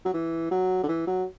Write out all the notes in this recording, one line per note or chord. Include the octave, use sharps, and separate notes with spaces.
F#3
E3
F#3
D3
E3
F#3